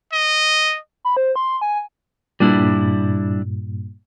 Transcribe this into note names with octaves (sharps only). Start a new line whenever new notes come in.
D#5
B5
C5
C6
G#5
G2 A#2 G3 D4 E4